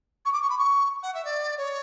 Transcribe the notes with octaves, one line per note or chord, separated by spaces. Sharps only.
C#6
D6
C#6
B5
C#6
F#5
E5
D5
C#5